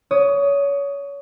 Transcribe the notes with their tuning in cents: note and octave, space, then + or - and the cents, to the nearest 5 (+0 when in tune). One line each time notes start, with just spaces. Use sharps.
C#5 +25 D#6 +0